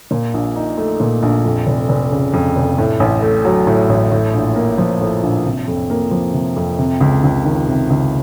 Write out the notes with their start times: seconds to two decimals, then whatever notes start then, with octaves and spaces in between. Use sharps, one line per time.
0.11 A#2
0.34 A#1
0.56 D#4
0.77 A3
1.00 A#2
1.23 A#1
1.45 F2
1.67 F1
1.89 F1
2.12 C#3
2.34 F2
2.56 F1
2.78 A2
3.00 A1
3.22 A3
3.45 F#3
3.67 A2
3.89 A1
4.11 A2
4.34 A#1
4.56 A#3
4.78 F3
5.01 A2
5.23 A#1
5.45 C3
5.68 F2
5.90 A#3
6.11 F3
6.34 C3
6.56 F2
6.79 C3
7.01 C#2
7.24 C#2
7.45 D#3
7.68 C3
7.90 C#2